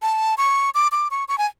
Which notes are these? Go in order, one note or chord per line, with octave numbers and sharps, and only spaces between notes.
A5
C#6
D6
D6
C#6
C#6
G#5